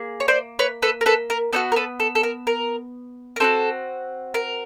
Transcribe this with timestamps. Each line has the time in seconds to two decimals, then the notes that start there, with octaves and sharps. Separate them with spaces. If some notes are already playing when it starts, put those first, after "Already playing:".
Already playing: A#3 G#4
0.20 C#5
0.28 C5 D5
0.59 B4 C#5
0.82 A4 B4
1.01 A#4
1.06 A4 B4
1.30 A#4
1.53 B3 D#4 F#4 A4
1.72 A#4
1.76 A4 B4
2.00 A4
2.15 A4
2.23 A#4
2.47 A#4
3.36 A#4
3.40 C4 D#4 F#4 A4
4.34 A#4